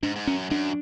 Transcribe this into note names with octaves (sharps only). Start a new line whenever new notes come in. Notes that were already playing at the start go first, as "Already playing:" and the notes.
G#2 D4
G#2
F#2 C#4
F#2 D4